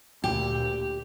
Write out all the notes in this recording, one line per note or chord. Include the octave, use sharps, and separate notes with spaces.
D2 A#2 G4